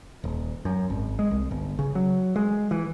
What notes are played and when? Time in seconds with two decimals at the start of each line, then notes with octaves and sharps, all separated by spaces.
0.24 D#1
0.65 F#2
0.90 G#1
1.19 G#3
1.31 C2
1.51 G1
1.79 C#3
1.95 F#3
2.36 G#3
2.71 E3